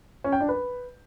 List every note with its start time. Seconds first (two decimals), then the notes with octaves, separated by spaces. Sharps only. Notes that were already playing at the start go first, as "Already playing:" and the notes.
0.24 C#4
0.32 G5
0.41 D4
0.49 B4